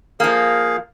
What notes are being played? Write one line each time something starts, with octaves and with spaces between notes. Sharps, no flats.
F3 A#3 G#4 F5